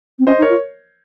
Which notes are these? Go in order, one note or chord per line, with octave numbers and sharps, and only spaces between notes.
C4
C#4 C5 D#5
D#4
A#4 C#5
F4